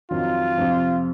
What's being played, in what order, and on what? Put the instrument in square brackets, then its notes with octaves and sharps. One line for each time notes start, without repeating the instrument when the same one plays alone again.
[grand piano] F2 D#3 F#3 [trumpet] F4
[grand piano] F2 C3 F3